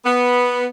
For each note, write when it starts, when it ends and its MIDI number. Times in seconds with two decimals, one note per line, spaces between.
0.05 0.65 59